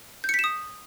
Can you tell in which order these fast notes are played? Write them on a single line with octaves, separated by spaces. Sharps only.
G6 C#7 B6 E7 D#6